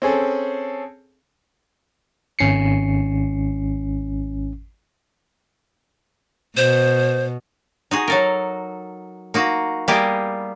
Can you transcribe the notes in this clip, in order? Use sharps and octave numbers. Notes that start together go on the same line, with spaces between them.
C4 C#4 G#4 A4
G#1 C#4 C7 C#7
B2 C5
D#4 F#4 G#4
F#3 A4 A#4
A#3 D#4 F#4
G3 A#3 B3 E4 G4 G#4